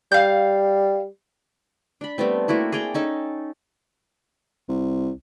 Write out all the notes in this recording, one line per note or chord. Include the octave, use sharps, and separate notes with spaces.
G3 F5 G6
D4 B5
G3 A3 B3 C4
A3 A#3 E4 F#4
G#4 D5 G5 A#5
C#4 D#4 A4
C2